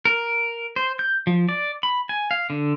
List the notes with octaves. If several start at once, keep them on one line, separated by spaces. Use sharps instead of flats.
A#4
C5
G6
F3
D5
B5
G#5
F5
D3